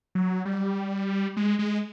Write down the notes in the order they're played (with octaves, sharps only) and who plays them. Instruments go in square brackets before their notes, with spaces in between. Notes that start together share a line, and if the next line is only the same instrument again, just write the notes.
[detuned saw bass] F#3
G3
G#3
G#3